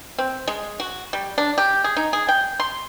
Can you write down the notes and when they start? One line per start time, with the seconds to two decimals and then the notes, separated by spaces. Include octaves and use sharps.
0.18 C4
0.48 G#3
0.80 F#4
1.13 G3
1.38 D4
1.58 G4
1.84 G#4
1.97 D#4
2.13 G#4
2.29 G5
2.60 C6